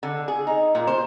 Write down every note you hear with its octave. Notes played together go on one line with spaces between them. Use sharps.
D3
G#4
D#4
A#2
C5